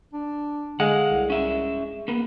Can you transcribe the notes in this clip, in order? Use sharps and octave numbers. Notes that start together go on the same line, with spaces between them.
D4
D3 G#3 F5 F#5
C2
C#4 E5
A#3 B3